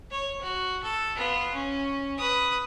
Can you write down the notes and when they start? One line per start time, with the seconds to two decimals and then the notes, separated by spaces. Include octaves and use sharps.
0.11 C#5
0.41 F#4
0.84 A4
1.15 B3 F4
1.54 C#4
2.18 B4 D#6